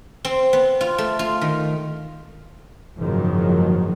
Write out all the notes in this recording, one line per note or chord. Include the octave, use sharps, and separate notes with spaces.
C4
B3
F4
A3
F4
D#3
F#1 G#2 D#3 F3 F#3